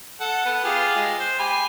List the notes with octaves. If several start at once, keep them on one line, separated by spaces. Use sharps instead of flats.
A4 F#5
B3 B4
F4 G4 G#4
G#3
C5
G4 G#5 B5